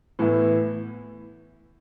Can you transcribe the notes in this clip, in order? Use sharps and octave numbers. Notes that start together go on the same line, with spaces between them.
A2 E3 B3 E4